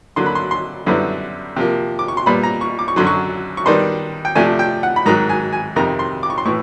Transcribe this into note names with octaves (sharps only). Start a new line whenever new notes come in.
D3 F#3 A#3 C6
B5
C6
C6
F#2 D3 G3 B3 E4
C3 F3 A#3
D6
C#6
C6
A#2 G3 B3 B5
A#5
C#6
D6
C#6
F#2 D3 F#3 C6
C#6
C#6
D#3 G3 B3 D4 C6
G5
C3 F3 A3 D4 G#5
G5
F#5
B5
G#2 D#3 F#3 A#5
G#5
G#5
F2 C3 D#3 A#5
C6
D6
C#6
C6
A2 E3 C#6